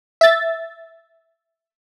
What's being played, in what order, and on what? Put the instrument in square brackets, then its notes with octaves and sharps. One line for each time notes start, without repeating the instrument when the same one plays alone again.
[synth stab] E5 A6